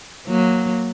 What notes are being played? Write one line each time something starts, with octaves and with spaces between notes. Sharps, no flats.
F#3 A#3